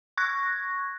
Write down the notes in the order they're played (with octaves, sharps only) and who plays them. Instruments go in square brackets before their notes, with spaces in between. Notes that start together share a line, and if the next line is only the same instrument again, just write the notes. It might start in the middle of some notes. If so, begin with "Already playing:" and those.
[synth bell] C#6 F#6 G#6 A#6